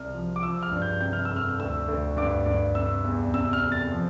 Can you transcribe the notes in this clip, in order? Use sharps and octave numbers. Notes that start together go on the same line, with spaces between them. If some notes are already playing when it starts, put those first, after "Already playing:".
Already playing: C2 F6
F3
D6
F3 E6
F6
G2
G6
C3 G6
F6
F2 E6
F6
D2 E6
D2
G2 D6
G2
C3 E6
E2
C3 E6
F6
F2
A6
F3